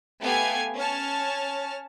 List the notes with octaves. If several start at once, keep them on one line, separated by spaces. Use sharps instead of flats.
A3 B3 G4 F5 G#5
C#4 C#5 A5 F6